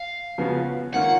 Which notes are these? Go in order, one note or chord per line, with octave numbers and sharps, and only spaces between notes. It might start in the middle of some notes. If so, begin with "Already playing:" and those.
Already playing: F5
C#3 F3 B3 F#4
D#3 A#3 C#4 F4 F#5